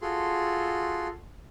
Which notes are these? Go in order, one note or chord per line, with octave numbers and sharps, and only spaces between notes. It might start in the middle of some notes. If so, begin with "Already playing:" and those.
F4 F#4 G#4 A4 C6